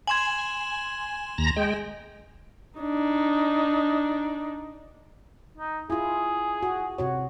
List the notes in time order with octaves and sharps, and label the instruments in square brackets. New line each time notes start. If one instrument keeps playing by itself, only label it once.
[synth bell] G#5 C6 [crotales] G#6 E7 F#7
[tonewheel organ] D#2 A#5 A#6
G#3 G5
[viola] D4 D#4
[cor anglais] D#4
[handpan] E4 F4 [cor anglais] G#4
[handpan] F#4
C3 F#4 C#5